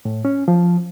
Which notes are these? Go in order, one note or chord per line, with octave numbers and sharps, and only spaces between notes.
A2
C#4
F3